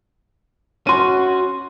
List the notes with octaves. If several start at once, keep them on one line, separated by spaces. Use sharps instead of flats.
C#4 F#4 C6 D#7